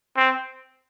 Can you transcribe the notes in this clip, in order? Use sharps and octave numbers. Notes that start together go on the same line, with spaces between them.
C4